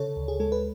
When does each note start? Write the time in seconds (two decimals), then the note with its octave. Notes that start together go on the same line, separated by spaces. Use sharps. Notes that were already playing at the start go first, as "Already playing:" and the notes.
Already playing: C#3 A4 C#5
0.17 D2
0.28 G#4
0.40 G#3 A4
0.52 B4